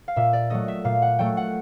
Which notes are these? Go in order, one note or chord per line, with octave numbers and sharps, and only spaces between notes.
F5
A#2 E5
D5
F#3 A3 D#5
E5
A#2 F5
F#5
F#3 A3 G5
F#5